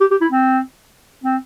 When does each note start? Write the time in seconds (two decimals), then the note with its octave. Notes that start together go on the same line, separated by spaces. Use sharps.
0.01 G4
0.11 G4
0.21 E4
0.32 C4
1.24 C4